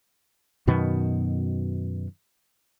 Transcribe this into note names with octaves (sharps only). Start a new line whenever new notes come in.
F#2 B2 D#3 B3